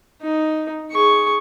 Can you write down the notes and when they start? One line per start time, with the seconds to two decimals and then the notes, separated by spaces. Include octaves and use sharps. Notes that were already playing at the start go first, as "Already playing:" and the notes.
0.22 D#4
0.92 G#4 C#6